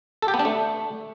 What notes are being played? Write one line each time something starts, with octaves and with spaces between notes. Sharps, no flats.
A4
G4
B3
D4
A3